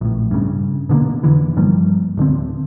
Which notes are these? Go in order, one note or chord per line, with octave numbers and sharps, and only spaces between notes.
A#1 A2
G2 C#3
B2 D3 F3 A#3
F1 D3 E3
G2 F3 G3 A#3
D1 D3 C4